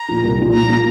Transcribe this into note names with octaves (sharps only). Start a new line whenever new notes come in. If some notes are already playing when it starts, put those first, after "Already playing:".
Already playing: A#5
A#2 F3
C2
A#2 F3
A#2 A#5
F3 A#3